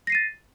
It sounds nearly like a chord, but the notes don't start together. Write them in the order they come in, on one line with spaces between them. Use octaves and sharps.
A#6 C7 D#7 A6